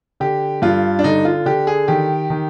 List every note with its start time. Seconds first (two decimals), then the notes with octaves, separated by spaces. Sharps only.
0.20 D3 G4
0.62 G2 F4
0.99 D4
1.04 D3 D#4
1.25 F4
1.46 D3 G4
1.67 G#4
1.88 D#3 G4
2.30 D#3